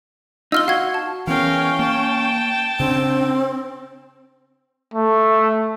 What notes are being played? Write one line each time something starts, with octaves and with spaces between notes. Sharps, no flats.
D#4 F4 E6 F6 G7
F#4 F5 G#6
A5
E3 B3 C#4 A#4 F5 G5
A#3 A5
C#3 C4 D4
A3